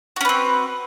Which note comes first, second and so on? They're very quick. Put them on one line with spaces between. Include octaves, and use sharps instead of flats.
F#4 C#4 B4 C4